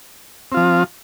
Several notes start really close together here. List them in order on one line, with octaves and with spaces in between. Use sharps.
C4 F4 F3